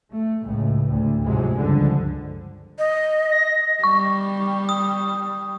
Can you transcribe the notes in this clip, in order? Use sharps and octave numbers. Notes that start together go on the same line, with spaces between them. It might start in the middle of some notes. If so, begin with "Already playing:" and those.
A3
C#2 A2
D2
G#2 C3 F3 F#3 G#3
C#2 G2 D3 F3
D#5
A#6
G3 C#6
D#6